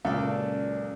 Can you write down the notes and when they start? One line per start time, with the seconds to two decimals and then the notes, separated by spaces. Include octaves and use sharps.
0.05 C#2 F#2 A#2 A4 B4 D5